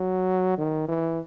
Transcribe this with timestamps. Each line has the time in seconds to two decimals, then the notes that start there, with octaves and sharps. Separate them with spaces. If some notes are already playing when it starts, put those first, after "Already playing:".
Already playing: F#3
0.58 D#3
0.89 E3